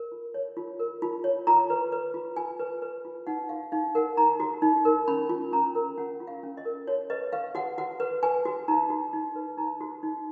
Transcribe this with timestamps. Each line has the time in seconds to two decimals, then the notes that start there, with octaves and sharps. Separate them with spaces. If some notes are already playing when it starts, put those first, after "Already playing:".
Already playing: A#4
0.12 F4
0.34 C#5
0.57 F4
0.79 A#4
1.02 F4
1.24 C#5
1.47 F4 A#5
1.70 B4
1.92 B4
2.14 F4
2.36 F4 G#5
2.59 B4
2.82 B4
3.05 F4
3.27 D#4 F#5
3.49 F#4 F5
3.72 D#4 F5
3.95 A#4 F#5
4.17 D#4 A#5
4.40 F#4
4.62 D#4
4.85 A#4
5.08 C#4 B5
5.29 F4
5.52 C#4 A#5
5.75 A#4
5.98 C#4 F#5
6.20 F4
6.27 F5
6.43 C#4
6.57 D#5
6.65 A#4
6.87 F#4 C#5
7.10 B4 D#5
7.33 B4 F5
7.55 F#4 F#5
7.78 F#4 F#5
8.00 B4
8.23 B4 G#5
8.45 F#4
8.68 D#4 A#5
8.90 F#4
9.13 D#4
9.36 B4
9.58 D#4 A#5
9.81 F#4
10.03 D#4